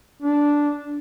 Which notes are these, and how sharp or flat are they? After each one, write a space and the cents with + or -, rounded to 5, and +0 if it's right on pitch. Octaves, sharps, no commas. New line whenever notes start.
D4 -5